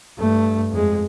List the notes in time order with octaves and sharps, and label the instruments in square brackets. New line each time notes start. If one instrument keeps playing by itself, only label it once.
[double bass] G2 A3
F2 G#3